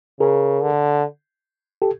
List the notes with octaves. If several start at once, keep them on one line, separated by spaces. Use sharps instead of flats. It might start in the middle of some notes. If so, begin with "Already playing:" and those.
C#3 G#4 A#4
D3
G4 A4